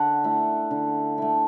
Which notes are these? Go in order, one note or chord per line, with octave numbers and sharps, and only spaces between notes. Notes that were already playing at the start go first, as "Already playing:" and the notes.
Already playing: D3 F#5
A3 E4
D3
A3 E4